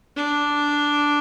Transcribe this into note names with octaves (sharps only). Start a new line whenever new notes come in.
D4